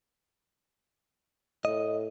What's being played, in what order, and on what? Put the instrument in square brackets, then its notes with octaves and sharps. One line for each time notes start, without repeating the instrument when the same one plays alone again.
[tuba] A2 [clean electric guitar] D#5